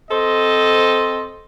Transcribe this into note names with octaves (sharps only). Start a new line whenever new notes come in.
C4 A4 C5 D#5